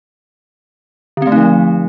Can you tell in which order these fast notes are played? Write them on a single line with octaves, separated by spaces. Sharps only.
D3 C4 A3 D#4 F3